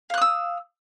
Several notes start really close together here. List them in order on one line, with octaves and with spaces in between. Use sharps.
F5 F#6 D#6 E6